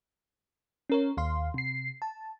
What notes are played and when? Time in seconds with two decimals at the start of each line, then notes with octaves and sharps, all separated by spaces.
0.90 C#4 A#4 C#5
1.17 D#2 F5 C6
1.54 C3 C7
2.02 A5